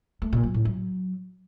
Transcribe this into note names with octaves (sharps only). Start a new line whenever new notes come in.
A3
A#2
F#3
A2
F#3